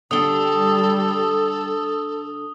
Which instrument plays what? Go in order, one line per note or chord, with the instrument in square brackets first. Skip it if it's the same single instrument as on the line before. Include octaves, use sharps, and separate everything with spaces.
[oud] D3 D4 [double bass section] G3 [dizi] A4 [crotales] D#6 G7